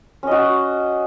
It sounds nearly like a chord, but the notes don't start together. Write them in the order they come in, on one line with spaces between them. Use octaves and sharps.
C#4 D#5 F#4